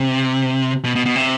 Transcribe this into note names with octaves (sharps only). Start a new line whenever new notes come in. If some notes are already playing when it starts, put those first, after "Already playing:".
Already playing: C3
B2
B2
B2
C3